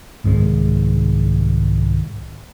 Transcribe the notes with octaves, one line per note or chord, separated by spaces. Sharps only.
C2 G#2 D#3 G#3